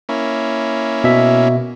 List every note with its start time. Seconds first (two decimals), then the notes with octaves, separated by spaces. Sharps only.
0.09 A#3 C#4 E4
1.04 B2 E5